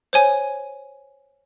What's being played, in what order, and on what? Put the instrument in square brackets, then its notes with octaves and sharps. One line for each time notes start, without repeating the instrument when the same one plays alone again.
[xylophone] C5 C#5 G#5